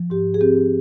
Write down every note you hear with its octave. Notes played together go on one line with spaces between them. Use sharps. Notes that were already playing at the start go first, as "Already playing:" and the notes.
Already playing: F3
G#2 G4
G#4
C4 G4